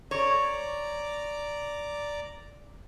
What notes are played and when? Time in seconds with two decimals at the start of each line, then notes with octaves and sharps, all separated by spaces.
0.11 C#5 D5 A#5 D6